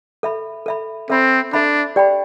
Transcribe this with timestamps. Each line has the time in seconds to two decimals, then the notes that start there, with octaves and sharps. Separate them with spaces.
0.23 A4 E5 B5
0.66 A4 E5 B5
1.09 C4 A4 E5 B5
1.53 D4 A4 E5 B5
1.96 G4 D5 G5 B5